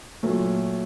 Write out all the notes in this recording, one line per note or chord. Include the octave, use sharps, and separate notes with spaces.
A#2 F#3 A3